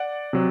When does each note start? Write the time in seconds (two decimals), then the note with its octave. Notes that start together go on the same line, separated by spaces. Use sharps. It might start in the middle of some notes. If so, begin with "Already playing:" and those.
Already playing: D5 F#5
0.33 C3 F#3